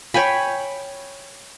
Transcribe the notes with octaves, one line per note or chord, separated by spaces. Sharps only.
C#5 G5 G#5 B5